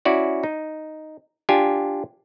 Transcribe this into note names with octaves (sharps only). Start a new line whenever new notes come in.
C#4 E4 F#4 D5
D#4
D4 F4 G4 G#5